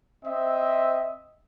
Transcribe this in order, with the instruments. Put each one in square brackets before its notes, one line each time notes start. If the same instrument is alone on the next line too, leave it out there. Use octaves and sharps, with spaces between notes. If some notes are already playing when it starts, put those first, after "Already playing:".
[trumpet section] C4 D#5 E5